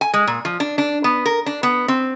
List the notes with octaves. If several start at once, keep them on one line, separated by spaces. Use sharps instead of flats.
G#5
G#3
A#2
F3
D4
D4
B3
A#4
D4
B3
C4